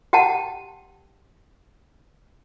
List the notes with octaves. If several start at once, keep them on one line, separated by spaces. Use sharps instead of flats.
G4 F#5 G5 A5